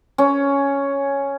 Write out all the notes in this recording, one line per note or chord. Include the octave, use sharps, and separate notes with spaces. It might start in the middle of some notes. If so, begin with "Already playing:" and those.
C#4